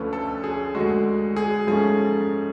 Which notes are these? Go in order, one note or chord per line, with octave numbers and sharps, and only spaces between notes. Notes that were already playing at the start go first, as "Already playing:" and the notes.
Already playing: D2 D3 F3 A3 C#4 B4
A4
G#4
D2 D3 G#3 F#4
G#4
G#2 F3 A3 C#4 G#4